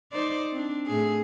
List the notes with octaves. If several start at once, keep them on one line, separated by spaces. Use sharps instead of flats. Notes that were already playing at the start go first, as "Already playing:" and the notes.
D#4 C5 D5
C4 D4
A2 G#4